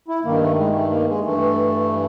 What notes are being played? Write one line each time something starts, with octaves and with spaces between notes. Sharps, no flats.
E4
G2 D#3 A#3
A3
G#3
A3
A#3
G#3
G2 E3 A3